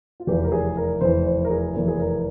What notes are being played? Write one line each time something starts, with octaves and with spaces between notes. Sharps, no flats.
F4
F1 E2 E3 G4
A#4
G#4
A#4
F1 E2 E3 C5
C5
A#4
G#4
F1 E2 E3 A#4
G#4
A#4